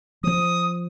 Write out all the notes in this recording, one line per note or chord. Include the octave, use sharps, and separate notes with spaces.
F3 D#6